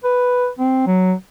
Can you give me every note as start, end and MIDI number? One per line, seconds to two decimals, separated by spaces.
0.04 0.48 71
0.59 0.87 60
0.87 1.13 54